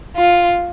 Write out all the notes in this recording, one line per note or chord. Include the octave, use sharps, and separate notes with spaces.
F4